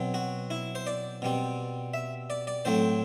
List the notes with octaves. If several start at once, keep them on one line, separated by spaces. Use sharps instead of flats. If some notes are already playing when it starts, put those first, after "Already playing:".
Already playing: B2 F#3 C4
F#4
E4
C5
D5
B2 G3 C4
E5
D5
D5
A2 F#3 A3 C4 C5